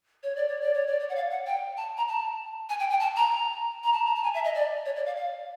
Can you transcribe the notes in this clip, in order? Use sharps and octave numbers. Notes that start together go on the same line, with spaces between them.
C#5
D5
C#5
D5
C#5
D5
C#5
F#5
F5
F#5
G5
A5
A#5
A5
G#5
G5
G5
A5
A#5
A#5
A5
A#5
A5
G#5
E5
D#5
D5
C#5
D5
F5
F5